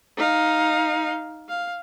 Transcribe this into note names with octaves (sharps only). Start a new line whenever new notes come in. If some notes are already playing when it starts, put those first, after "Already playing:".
D#4 F5
F5